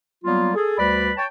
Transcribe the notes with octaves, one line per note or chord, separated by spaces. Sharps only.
F#3 G3 A#3 B3 F4
G#4 A4
D2 G3 B4 D5 B5
C#5 G5 A5